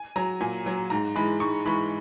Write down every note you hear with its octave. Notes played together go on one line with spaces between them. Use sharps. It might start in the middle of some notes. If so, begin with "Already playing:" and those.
Already playing: G#5
F#3 A#5
A#2 G#5
F#3
G#2 A#5
E3 G#3 B5
G#2 C#6
E3 G#3 B5